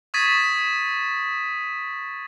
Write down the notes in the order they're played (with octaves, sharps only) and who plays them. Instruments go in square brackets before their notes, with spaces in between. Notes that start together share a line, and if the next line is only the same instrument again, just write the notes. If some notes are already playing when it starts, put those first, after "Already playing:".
[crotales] C#6 D#6 G#6 A6 B6 D#7